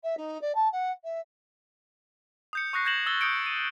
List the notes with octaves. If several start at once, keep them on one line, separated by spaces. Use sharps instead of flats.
E5
D#4
D5
A5
F#5
E5
D#6 G6 C#7
C#6 D#6 F#6 A#6 C7
G6 G#6 A#6 E7 F#7
D#6 E6 A6 G7
D#6 G6 C#7 D7
D#7